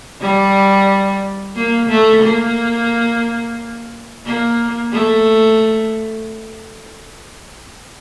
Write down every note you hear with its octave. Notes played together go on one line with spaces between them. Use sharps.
G3
A#3
A3
A#3
A#3
A3